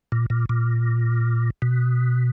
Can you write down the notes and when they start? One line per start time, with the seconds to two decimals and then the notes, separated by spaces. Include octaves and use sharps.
0.12 A#2
0.30 A#2
0.49 A#2
1.62 B2